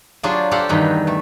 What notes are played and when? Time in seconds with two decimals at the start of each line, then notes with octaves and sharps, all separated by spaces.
0.23 F#3 D4 F4 G4 G#4 A5
0.51 G4 A4 C5 F5 F#5
0.69 E2 G2 D#3 B4
1.07 A3